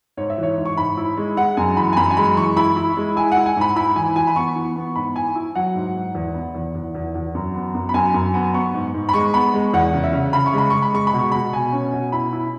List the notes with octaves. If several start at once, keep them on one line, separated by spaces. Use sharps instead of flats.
G#2 C#5
E5
E3 C#5
G#2
C#6
G#2 B5
E4
G#3
G#3 F#5
F#2 G#5
E3 B5
G#5
F#2 B5
G#5
G#3 B5
E3 C#6
E4 B5
E4
G#3
E4 G#5
F#5
E4
G#5
G#2 B5
E4 B5
E3 G#5
E3 G#5
B5
B3 C#6
E3
B3
G#2 B5
E4 G#5
E4
F#3 F#5
G#2
G#2
E2
B3
E2
E2
E2
E2
F#2
B3
F#2
B5
F#2 G#5
F#2
B3
B3 C#6
G#2
G#2
B5
G#3 C#6
B3 B5
G#3
E2 F#5
C#3
E5
C#3
C#3 B5
C#6
G#3 B5
G#3 C#6
B5
G#3 C#6
B5
B2
C#6
B2 B5
B2 G#5
C#4
B2
E4 B5
E4